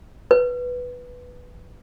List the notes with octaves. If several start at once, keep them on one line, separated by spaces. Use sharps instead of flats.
B4